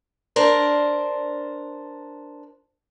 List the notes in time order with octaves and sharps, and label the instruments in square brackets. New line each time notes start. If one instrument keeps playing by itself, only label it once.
[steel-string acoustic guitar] D4 A#4 C5